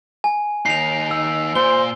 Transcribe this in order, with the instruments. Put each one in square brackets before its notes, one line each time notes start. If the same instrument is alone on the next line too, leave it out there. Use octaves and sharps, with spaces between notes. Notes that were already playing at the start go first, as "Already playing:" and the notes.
[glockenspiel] G#5
[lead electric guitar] D#2 D#4 [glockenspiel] C7 F7
[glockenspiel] E6
[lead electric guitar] A#2 [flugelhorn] C5 [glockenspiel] G7